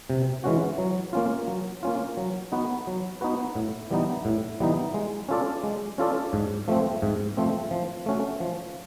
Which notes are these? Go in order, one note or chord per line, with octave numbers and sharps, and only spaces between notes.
C3
E3 G#3 C#4 F#4
F#3
A#3 C#4 F4
F#3
A#3 C#4 F4
F#3
B3 D#4 F#4 B4
F#3
B3 D#4 F#4 B4
A2
E3 G3 B3 D#4
A2
E3 G3 B3 D#4
G#3
C#4 F4 A4 D5
G#3
C#4 F4 A4 D5
G#2
F3 A3 C4
G#2
F3 A3 C4
F3
A3 C#4 F#4
F3